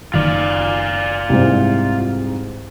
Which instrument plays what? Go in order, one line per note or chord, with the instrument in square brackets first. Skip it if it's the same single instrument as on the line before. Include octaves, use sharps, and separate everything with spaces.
[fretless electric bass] F#1 D#3 [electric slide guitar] F4 D5
[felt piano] C2 G#2